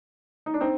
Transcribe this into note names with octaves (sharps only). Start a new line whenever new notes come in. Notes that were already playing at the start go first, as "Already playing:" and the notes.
D#4
D4
C4 D#4